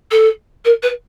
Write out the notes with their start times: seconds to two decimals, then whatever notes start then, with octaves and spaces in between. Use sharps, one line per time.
0.11 A4
0.65 A#4
0.83 B4